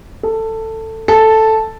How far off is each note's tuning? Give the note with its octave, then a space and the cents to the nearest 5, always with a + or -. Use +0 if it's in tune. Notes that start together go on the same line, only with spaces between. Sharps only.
A4 +15
A4 +0